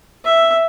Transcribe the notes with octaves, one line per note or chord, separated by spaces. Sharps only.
E5